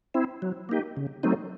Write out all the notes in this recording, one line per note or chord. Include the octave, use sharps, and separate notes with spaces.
C4 E4
F#3
A#3 D#4 G4
C#3
F#3 A3 C4 D#4